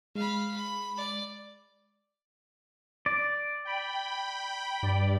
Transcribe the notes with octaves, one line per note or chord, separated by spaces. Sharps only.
G#3 F5 B5
B5
D5
D5
G5 B5
G2 D5